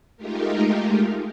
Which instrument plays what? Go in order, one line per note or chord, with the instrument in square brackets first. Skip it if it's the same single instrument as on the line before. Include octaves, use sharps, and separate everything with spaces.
[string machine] G#3 A3 D#4 F4 G4 A#4